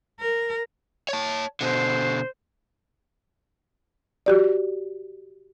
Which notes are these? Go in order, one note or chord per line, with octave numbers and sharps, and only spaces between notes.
A#4
C#5 A5
B2 D3 C5
F#4 G4 D5